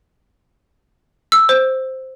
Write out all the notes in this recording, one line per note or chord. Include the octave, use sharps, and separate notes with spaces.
E6
C5